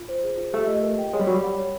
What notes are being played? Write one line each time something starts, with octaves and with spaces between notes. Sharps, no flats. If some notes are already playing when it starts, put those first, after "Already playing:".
Already playing: F4
C5
G#4
F4
A3 G4
D#5
A#4
G5
G#3 C#5
G3
F#3 B5
G3
F#5
C#5